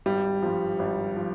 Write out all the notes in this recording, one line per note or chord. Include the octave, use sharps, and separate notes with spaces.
G#1 G3
G2 F3
G#1
F3